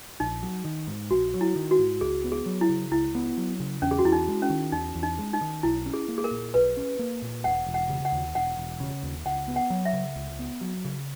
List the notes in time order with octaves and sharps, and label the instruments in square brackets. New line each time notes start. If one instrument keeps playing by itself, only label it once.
[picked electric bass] A#1 [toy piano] D#4
[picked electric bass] F#3
D#3
G#2
[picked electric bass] A#1 [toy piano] F#4
[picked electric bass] F#3
[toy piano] E4
[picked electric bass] D#3
[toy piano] F#4
[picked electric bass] G#2
[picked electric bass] C#2 [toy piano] G#4
[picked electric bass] B3
[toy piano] G#4
[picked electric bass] F#3
[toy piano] E4
[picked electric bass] C#3
[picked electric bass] C#2 [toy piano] E4
[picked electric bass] B3
F#3
C#3
[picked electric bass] E2 [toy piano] C#4
[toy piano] G#4
F#4
[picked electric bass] E2 [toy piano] E4
[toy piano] D#4
[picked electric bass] G#3
[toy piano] C#4
[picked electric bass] D#3
[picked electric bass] E2 [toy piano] D#4
[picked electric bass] E2
[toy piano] D#4
[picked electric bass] G#3
[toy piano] D#4
[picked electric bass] D#3
[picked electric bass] B1 [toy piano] E4
[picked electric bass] C#4
[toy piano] G#4
[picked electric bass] A#3
[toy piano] G#4
A#4
[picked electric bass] A#2
[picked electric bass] B1 [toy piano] B4
[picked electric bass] C#4
A#3
A#2
[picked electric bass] E1 [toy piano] F#5
[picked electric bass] E1
[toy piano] F#5
[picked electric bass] C#3
[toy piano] F#5
[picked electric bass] D#2
[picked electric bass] E1 [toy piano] F#5
[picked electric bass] E1
C#3
D#2
[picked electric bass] C#2 [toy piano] F#5
[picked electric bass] B3
[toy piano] F#5
[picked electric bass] F#3
[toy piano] E5
[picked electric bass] C#3
C#2
B3
F#3
C#3